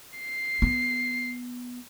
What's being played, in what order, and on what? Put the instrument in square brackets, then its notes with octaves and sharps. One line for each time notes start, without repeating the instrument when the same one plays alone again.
[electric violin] C7
[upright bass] B3